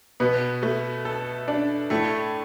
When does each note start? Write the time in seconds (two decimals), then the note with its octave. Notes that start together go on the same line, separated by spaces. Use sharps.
0.20 B2 B3
0.63 A3
1.05 A4
1.48 D4
1.90 A2 A3